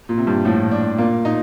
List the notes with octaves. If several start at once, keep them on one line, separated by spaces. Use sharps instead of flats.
A#2
C3
G2
A2 F3
D4
A#2 A#3
A#2 D#4